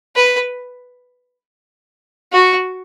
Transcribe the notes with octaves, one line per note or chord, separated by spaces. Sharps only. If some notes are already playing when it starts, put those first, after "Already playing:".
B4
F#4